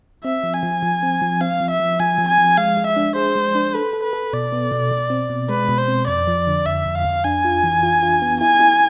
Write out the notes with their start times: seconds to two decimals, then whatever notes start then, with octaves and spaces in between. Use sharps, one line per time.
0.24 C4 E5
0.44 F3
0.53 G#5
0.63 F3
0.83 F3
1.03 C4
1.22 F3
1.41 C4 F5
1.60 F3
1.70 E5
1.80 F3
2.00 F3 G#5
2.18 F3
2.29 G#5
2.38 F3
2.58 G#3 F5
2.77 G#3
2.87 E5
2.96 D4
3.16 G#4 C5
3.36 G#3
3.55 D4
3.75 A4 B4
3.93 A4
4.03 B4
4.13 A4
4.33 B2 D5
4.52 B3
4.72 B2
4.91 B2
5.10 C4
5.30 B2
5.49 G#3 B4
5.69 B2
5.78 C5
5.88 C4
6.08 F2 D5
6.27 F3
6.47 D3
6.66 F2 E5
6.86 F2
6.95 F5
7.05 F2
7.25 D4 G#5
7.45 F4
7.64 E3
7.83 F4
8.03 F4
8.22 B3
8.41 E4 G#5
8.60 E4